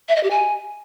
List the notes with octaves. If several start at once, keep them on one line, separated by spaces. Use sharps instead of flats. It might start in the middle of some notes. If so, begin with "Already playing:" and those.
E5
D#5
G4
G#5